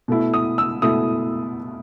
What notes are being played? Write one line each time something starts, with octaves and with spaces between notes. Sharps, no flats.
B2 A3 E4
D#6
E6
B2 A3 E4 D#6